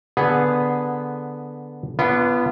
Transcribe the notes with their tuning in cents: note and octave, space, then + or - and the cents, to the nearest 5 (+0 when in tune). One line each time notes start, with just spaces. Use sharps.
D3 +0 B3 +0 G#4 +0
B3 +0 D4 -5 F4 -35